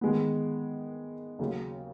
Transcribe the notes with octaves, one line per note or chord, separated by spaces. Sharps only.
D#3 G#3 B3
D#2 C#3 F#3